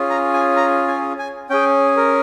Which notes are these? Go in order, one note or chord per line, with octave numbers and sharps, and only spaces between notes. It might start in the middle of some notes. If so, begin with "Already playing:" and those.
Already playing: C#4 F4 G#4
A#5
G#5
A#5
G#5
G#5
C#4 G#4 G5
A#4